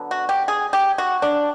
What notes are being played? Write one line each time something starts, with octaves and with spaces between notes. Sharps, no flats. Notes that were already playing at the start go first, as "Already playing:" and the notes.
Already playing: D3 F#3 B3
F#4
G4
G#4
G4
F#4
D4